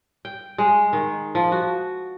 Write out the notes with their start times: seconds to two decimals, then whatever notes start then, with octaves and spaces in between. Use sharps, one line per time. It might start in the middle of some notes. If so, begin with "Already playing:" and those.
0.25 G5
0.58 G#3
0.93 D#3
1.35 F3
1.52 F#4